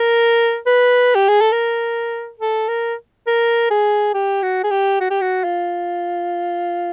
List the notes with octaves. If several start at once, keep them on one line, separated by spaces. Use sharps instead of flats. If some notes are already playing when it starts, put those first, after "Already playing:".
Already playing: A#4
B4
G4
G#4
A4
A#4
A4
A#4
A#4
G#4
G4
F#4
G#4
G4
F#4
G4
F#4
F4